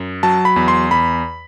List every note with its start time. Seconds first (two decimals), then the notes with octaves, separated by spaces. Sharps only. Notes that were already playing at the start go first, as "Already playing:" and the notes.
Already playing: F#2
0.23 F#3 A5
0.45 B5
0.56 E2
0.68 C6
0.91 E2 B5